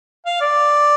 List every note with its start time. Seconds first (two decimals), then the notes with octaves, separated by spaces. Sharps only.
0.26 F5
0.40 D5